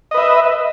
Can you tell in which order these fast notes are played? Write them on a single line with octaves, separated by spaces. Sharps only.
D#5 B4 E5